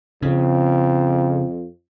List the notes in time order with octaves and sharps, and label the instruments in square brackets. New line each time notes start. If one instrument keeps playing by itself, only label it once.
[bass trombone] F2 [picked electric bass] C#3